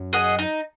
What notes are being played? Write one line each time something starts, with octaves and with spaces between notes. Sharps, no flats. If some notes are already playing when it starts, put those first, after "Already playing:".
Already playing: F#2 F#3
G#4 D#5 F#5
D#4